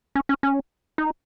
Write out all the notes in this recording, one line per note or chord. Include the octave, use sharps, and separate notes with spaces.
C#4
C#4
C#4
D#4